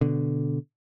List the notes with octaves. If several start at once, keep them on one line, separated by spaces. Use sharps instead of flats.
B2 D3